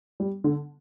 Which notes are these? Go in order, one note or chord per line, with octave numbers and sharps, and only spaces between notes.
G3
D3